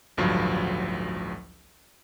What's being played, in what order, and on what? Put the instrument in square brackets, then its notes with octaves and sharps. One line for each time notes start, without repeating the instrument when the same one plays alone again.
[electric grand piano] A1 D2 G2 F3 F#3